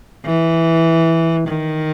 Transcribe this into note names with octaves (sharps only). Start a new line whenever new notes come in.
E3
D#3